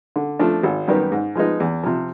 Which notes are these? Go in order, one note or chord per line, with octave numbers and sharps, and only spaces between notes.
D3
F3 A3 D4
G#1
F#2 D#3 G3 B3
G#2
F3 G#3 B3 D#4
E2
C3 F3